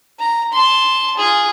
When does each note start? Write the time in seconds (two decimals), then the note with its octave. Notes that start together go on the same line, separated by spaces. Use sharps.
0.19 A#5
0.52 A5 C6
1.17 F4 G#4